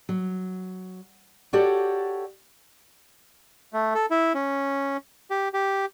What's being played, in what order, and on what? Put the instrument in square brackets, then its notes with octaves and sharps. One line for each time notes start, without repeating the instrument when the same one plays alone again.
[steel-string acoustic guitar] F#3
F#4 G4 A4 C#5 D5 F#5
[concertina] A3
A4
E4
C#4
G4
G4